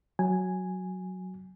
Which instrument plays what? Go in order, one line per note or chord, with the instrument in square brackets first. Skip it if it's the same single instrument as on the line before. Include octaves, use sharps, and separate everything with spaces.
[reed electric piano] F#3 G#5